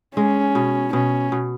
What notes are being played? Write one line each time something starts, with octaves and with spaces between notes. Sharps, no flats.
G#3 C#4
B2
B2 C#4
B2